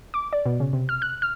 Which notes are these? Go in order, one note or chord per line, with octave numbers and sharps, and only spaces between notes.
D6
D5
B2
C#3
C3
F6
F#6
F6